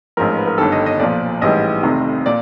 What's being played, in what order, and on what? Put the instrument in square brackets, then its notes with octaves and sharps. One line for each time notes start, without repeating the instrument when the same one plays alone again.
[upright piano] A1 G#2 F3 A#4
B4
A#4
G1 G2 D#3 G3 A4
D#5
D#5
B1 A#2 F3 D5
A1 G#2 E3 G3 D#5
F1 F2 C3 D#3
A#2 D5